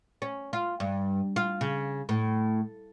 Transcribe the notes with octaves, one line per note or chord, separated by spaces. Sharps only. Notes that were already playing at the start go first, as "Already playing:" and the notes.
C#4
F4
G2
F4
C#3
A2